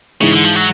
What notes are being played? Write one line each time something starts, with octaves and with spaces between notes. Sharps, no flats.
G#2 C#3 E3 G#3
D3
F3
F#3